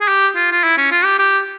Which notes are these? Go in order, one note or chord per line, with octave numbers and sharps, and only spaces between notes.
G#4
G4
F4
F4
E4
C#4
F4
G4
G4